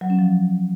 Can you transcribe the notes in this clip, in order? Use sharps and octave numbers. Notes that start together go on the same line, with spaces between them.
F#3
C#4
F3